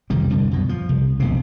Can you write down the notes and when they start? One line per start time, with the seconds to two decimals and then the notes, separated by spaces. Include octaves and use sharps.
0.10 C2 F2 D#3 G3
0.30 C2 G2 D3
0.51 F#2 B2
0.69 F3
0.89 C2
1.20 E1 A#1 C3